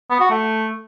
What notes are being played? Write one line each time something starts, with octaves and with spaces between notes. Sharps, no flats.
B3
F#4
A3